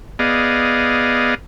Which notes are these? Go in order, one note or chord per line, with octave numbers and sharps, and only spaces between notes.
B3 G#4 D5 D#5 F5